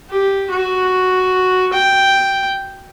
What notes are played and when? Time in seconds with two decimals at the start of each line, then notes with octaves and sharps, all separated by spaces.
0.10 G4
0.51 F#4
1.73 G5